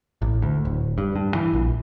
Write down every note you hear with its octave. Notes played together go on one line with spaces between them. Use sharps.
A1
D2
D1
G2
G2
E3
A#1